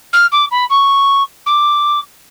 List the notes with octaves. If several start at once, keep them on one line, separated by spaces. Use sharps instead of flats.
F6
D6
B5
C#6
D6